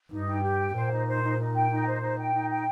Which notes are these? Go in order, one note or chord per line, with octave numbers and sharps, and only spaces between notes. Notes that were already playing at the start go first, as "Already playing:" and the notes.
G2 D#4
G5
G4
G5
A#2 C5
D#4
C5
D#4
D#4
G5
D#4
C5
D#4
G5
D#4
G5